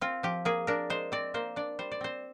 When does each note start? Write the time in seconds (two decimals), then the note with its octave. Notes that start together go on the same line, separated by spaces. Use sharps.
0.01 C4 F4
0.23 F3 G4
0.45 A#3 G#4
0.67 D4 A#4
0.90 G#3 C5
1.12 C4 D5
1.34 A#3 C5
1.56 D4 D5
1.79 G3 C5
1.91 D5
2.01 C4 C5